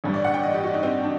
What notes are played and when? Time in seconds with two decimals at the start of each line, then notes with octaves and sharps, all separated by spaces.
0.04 A1 G2 D3 G3
0.14 D5
0.25 F#5
0.34 G5
0.43 D#5
0.54 G4
0.64 F#4
0.74 D#4
0.83 C4
1.03 D4